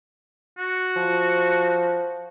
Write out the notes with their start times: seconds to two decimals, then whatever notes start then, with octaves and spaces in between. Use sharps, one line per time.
0.58 F#4
0.96 F3